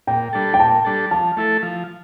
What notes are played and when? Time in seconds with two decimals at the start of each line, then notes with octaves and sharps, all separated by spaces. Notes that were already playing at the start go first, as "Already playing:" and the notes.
0.07 A#2 G5
0.33 G3 D4 A4
0.54 G5
0.59 A#2 A5
0.85 G3 D4 A4
1.11 F3 A5
1.37 A3 E4 A4
1.63 F3